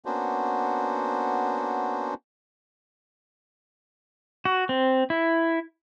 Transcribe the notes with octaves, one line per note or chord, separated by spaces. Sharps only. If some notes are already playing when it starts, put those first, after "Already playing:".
A#3 B3 C#4 D4 F#4 C5
F#4
C4
E4